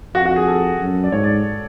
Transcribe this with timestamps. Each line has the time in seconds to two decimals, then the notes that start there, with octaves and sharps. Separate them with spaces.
0.14 F2 F#4
0.25 F#4
0.36 G#4
0.47 A4
0.80 F#2
1.03 D5
1.12 G#2 C#5
1.24 D5